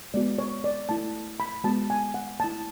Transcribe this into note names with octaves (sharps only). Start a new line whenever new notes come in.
G#3 B3 F#4 D5
C#5
D5
A3 E4 A5
B5
G#3 B3 F#4 A5
G#5
F#5
A3 E4 A5